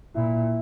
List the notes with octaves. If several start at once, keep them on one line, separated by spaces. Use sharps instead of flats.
A#2 E4